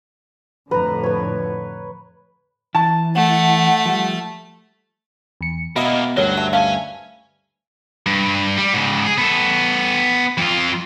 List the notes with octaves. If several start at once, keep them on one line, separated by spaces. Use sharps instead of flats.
F2 A2 D3 B4 A#5
B4 C#5
E3 A5
A3 F#5
F3 G3
E2 C#7
B2 A#3 B3 D#5 E5 B5
D2 G2 F#3 C#4 A#4 C#5 F6 A#6
E5 A5
C#4 F5 G#5 A5
G2
G3
G#2 C#3
G#4
B3 A4
F2 F4